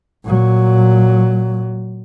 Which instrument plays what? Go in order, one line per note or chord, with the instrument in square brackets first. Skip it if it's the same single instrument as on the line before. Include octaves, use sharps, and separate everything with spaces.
[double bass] A#2 F#3